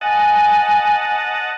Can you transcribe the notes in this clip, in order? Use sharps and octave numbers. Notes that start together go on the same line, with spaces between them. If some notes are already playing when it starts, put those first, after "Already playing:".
D#5 F#5 G#5 A5